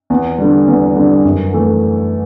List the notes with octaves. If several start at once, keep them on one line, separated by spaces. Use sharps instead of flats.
E2
D3 G3
E2
D3 G3
F#2
E3 A3